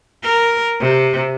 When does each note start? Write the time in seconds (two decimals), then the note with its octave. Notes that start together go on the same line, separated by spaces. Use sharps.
0.24 A#4
0.80 C3